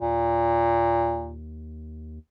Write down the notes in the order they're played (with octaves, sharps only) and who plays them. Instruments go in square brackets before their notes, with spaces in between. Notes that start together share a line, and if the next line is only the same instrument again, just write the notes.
[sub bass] D#2 [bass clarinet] A#2